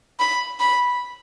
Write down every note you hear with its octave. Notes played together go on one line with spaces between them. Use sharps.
B5
B5